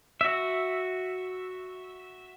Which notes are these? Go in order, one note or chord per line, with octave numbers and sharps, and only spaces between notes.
F#4 E5